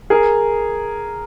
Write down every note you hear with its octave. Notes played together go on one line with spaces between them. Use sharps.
G#4 A#4